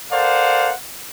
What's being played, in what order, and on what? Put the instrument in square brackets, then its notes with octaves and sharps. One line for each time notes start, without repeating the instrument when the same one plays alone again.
[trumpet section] A4 A#4 C5 D5 F5 F#5